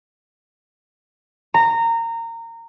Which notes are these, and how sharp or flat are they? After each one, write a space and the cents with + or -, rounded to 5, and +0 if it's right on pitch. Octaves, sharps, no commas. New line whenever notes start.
A#5 -20